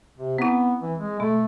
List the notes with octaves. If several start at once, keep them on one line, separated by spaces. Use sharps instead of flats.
C3
B3 C4 E4
E3
G#3
B2 A3